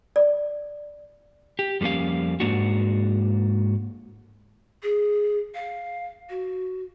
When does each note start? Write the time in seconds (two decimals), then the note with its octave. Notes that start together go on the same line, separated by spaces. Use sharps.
0.16 D5
1.59 G4
1.81 F2 G3 A#3 C#4 F5
2.40 G#2 B2 A#3 D4 F#4
4.83 G#4
5.55 F5
6.30 F#4